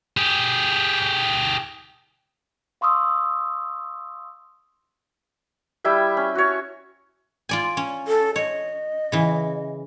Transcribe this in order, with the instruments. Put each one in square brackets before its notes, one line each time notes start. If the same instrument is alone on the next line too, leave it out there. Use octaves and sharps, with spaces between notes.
[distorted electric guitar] G4 G#4
[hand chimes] F5 C6 C#6 D#6 E6
[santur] G3 E4 E5 G5
C#4
F#4 C#5
[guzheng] F4 D5 G#5
C#4
[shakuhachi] A4
[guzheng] C#5 [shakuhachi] D#5
[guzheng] C#3 E3